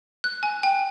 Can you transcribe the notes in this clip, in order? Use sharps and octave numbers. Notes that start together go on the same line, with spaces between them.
F#6
G#5
G5